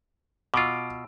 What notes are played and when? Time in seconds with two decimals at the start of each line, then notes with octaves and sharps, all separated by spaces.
0.54 B2 F4 D6 E6 D7